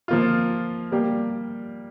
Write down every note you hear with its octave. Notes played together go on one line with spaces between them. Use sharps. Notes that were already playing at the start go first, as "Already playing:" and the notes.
F3 A#3 F4
G3 A#3 G4